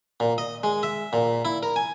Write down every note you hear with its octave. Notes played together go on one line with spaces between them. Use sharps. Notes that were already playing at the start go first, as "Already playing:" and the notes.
A#2
D#5
G#3
E5
A#2
E4
A#4
G#5